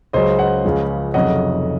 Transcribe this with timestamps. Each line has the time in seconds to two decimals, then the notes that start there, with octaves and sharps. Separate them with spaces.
0.13 C#2 C#3 F#3 C5 D#5
0.39 D#5 F#5
0.64 C#2 C#3 F3
1.14 F1 F2 C#3 F#3 D#5 F#5